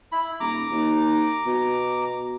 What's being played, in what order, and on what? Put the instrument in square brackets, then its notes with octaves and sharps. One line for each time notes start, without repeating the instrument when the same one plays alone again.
[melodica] E4 B5
[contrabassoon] D#1 [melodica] A#5 D6
[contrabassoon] D#2
B2